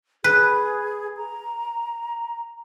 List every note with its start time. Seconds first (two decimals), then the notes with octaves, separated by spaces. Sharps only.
0.24 G#4 B4
1.17 A#5